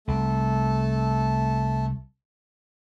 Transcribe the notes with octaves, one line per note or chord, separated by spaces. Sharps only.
C2 A3 A4